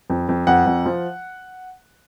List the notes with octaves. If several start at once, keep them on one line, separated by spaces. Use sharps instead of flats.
F2
F2
F2 F#5
F2
F3